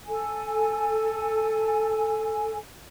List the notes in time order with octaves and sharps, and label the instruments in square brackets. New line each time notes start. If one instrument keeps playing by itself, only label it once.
[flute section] A4 G#5